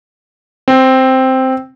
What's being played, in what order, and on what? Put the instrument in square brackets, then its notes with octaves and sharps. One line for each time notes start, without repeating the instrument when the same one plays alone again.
[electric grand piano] C4